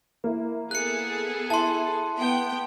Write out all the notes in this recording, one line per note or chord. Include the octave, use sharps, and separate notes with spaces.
A#3 E4
B3 G#4 A4 F#6 C#7
E4 A5 C6
B3 G5